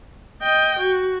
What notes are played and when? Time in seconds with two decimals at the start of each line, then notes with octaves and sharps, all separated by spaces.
0.42 D#5 G5
0.80 F#4